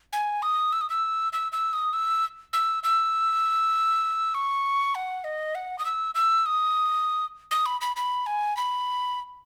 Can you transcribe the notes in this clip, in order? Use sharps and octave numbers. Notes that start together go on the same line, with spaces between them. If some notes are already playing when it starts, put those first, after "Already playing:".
G#5
D#6
E6
D#6
E6
E6
E6
D#6
E6
E6
E6
C#6
F#5
D#5
F#5
D#6
E6
E6
D#6
D#6
B5
B5
B5
G#5
B5